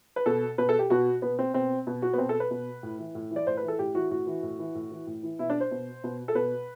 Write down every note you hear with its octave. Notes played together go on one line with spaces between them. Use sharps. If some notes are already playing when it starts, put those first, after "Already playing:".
B4
B2 A4
B2 B4
A4
G4
B2 F#4
B2 B3
C4
B2 C4
B2
F#4
B3
B2 C4
A4
B4
B2
A2
E3
A2
E3
D5
A2 C5
B4
E3
A4
A2 G4
E3 F#4
A2 F#4
E3
A2
E3
A2
E3
A2
E3
B2 E4
D4
C5
B2
B2
A4
B2 B4